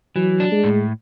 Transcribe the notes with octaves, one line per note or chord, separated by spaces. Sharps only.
E3 F#3
D4
G#3
A2